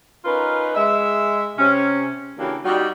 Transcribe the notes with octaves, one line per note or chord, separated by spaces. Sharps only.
C#4 D#4 F4 A#4 B4
G#3 E5
C3 C#4
C#3 E3 A#3 D4 F#4 G4
G3 D#4 F#4